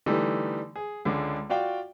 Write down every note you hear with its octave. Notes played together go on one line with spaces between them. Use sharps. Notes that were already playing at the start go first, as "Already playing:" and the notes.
D3 E3 G3 A3 D#4
G#4
C#2 D3 G#3
F4 F#4 D5 F5 G5